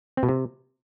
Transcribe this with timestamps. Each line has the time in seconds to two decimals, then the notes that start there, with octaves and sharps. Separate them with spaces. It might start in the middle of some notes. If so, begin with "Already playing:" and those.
0.17 C4
0.23 B2
0.29 C3